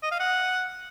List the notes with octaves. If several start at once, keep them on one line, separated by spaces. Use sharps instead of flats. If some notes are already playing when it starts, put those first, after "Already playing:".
D#5
F5
F#5